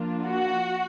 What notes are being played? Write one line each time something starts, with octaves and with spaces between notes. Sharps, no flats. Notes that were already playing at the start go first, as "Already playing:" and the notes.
Already playing: F3 A#3 D4 F4
F#4